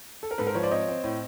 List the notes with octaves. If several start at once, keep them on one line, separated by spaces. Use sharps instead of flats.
A4
A#4
G#2 A4 B4
A#4 C5
F3 B4 C#5
C5 D5
C4 C#5 D#5
C4
A2